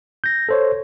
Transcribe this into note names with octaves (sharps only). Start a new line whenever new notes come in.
G6 A#6
A4 C5 C#5